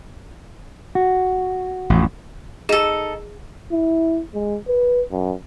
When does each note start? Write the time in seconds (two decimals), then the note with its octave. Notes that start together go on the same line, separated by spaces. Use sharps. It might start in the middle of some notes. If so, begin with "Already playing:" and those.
0.95 F#4
1.90 A1 F2
2.69 D#4 G#4 A4 E7
3.71 E4
4.34 G#3
4.68 B4
5.11 F#2